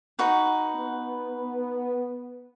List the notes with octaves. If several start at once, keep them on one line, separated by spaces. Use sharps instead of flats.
D#4 F#4 B4
B3